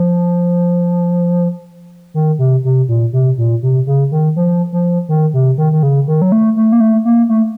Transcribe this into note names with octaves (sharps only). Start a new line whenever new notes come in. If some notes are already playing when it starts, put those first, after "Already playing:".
Already playing: F3
D#3
C3
C3
A#2
C3
A#2
C3
C#3
D#3
F3
F3
D#3
C3
D#3
D#3
C#3
D#3
F#3
A3
A3
A#3
A3
A#3
A3